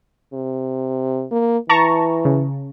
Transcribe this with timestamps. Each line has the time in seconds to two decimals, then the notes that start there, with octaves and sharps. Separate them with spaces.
0.33 C3
1.31 A#3
1.69 E3 A5 A#5 C#6
2.25 C#3